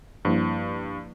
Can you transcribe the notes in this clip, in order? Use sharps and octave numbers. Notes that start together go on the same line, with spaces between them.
G2 F3 A#3 E4